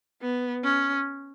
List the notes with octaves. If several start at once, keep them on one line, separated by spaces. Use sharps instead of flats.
B3
C#4